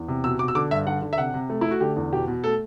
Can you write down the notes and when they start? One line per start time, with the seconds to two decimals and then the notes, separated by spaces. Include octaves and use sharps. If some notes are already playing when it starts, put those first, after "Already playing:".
Already playing: E2
0.08 C3
0.24 B2 E6
0.39 B2 D6
0.48 E6
0.55 D3 D6
0.71 G2 E5
0.87 D3 F#5
1.02 D3
1.13 E5
1.18 C3 F#5
1.34 C3
1.50 A3
1.61 A3 E4
1.71 F#4
1.81 D3 G4
1.96 E2
2.12 B2 G4
2.28 B2
2.44 A3 A4